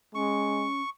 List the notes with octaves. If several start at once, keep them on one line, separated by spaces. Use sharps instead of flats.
G#3 C#4 C#6